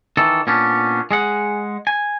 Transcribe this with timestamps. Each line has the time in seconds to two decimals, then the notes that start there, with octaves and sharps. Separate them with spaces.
0.17 D#3 E3 A4
0.47 A#2 B3 C#4 D4
1.11 G#3 G#4 F#5
1.87 G#5